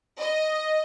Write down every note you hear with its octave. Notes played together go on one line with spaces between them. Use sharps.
D#5